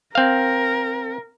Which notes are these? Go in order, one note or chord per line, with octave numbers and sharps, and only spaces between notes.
C4 A#4 F5